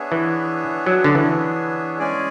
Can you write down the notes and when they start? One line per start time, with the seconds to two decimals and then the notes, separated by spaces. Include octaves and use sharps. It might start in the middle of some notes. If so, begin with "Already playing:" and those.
Already playing: B3 D4 G#4 C#5 E5
0.12 E3
0.86 F#3
1.04 D3
1.15 E3
1.99 G#3 C#4 G#4 D5